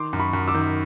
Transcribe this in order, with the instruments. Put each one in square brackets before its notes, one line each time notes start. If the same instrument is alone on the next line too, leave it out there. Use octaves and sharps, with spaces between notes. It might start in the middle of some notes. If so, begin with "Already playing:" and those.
Already playing: [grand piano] D#3 C6 D6
F#2
B5 C#6
F#2
D6 E6
D#3